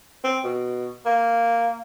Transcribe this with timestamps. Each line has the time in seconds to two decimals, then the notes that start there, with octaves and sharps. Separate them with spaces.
0.24 C4
0.44 B2
1.05 A#3